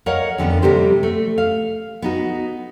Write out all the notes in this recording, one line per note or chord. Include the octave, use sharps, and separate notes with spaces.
A#4 C#5 D#5 F5 F#5
F2 D3 G#3 B3 C#4
C3 G3 A#3 G4 C5
A3
F5
B3 D#4 F#4